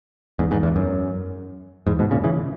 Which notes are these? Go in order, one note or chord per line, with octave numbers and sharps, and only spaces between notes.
E2 G#2
E2 G#2
E2
F#2
E2 G#2
G#2 B2
A#2 C#3
C#3 E3